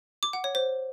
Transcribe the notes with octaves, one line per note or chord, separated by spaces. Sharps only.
D6
F#5
C#5
C5